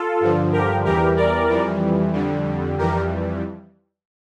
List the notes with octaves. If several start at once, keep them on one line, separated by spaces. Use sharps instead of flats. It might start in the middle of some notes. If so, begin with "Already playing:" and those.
Already playing: F4 A4
G2 D3 F3
G4 A#4
E2 E3 G3 G4 A#4
A#4 D5
F2 E3 G3
F2 D3 G3
F2 E3 G3 G4 A#4